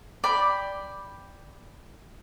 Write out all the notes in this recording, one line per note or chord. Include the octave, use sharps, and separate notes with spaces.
D5 G5 B5